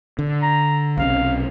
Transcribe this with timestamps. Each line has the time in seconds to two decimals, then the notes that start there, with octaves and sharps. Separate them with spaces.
0.19 D3
0.42 A#5
0.97 B1 C3 C#4 F5